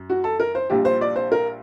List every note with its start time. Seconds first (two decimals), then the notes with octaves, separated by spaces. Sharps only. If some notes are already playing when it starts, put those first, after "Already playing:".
Already playing: F#2
0.10 F#4
0.24 A4
0.40 A#4
0.55 C5
0.70 A#1 A#2 G3 G4
0.85 C5
1.01 D5
1.16 C5
1.32 A#4